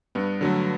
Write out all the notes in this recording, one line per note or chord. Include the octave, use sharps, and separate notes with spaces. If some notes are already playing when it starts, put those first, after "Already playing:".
G2 B3
D3 F#3 A3